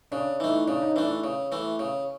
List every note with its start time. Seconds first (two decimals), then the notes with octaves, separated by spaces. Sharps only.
0.12 C#3 D4
0.40 E3 A3 D#4
0.67 C#3 D4
0.82 D#4
0.96 E3 A3 D4
1.24 C#3
1.52 E3 A3
1.79 C#3